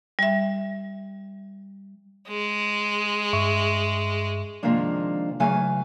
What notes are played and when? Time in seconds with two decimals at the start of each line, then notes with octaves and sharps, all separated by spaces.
0.19 G3 E5
2.28 G#3
3.33 G2 E5 C#6
4.63 C3 D#3 F3 G#3 A#3 D4
5.40 C#3 E3 F#3 A3 F5 G#5